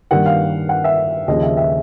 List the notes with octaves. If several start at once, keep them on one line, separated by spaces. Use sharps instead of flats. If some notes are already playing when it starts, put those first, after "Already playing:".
G2 D#3 G3 A#3 F#5
F5
F#5
E5
D#2 C#3 F3 D#5
E5
E5